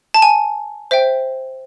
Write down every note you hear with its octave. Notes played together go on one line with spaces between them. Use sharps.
A5
G#5
C5 E5 G5